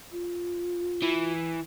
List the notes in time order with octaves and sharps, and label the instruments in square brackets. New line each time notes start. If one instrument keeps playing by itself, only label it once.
[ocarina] F4
[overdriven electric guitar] E3